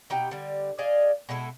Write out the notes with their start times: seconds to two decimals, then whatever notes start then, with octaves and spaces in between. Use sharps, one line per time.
0.10 B2 D#4 G4 G5
0.31 D3 G3
0.78 G#4 D5 D#5 F5
1.29 B2 G#3 E4 A4